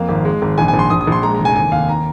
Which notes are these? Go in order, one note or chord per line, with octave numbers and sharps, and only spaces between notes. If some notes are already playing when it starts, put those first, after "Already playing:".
Already playing: F2 A#3 F5
G#1
G#3
G#1
A#1 G#5
G#5
A#1
C6
A#1 D#6
D#6
A#1 C6
G#3 A#5
A#5
F1
G#5
D#2 G#5
D#2 F5
A#5